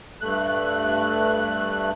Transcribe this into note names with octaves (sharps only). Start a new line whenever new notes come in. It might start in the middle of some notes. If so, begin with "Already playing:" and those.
G2 A3 F#6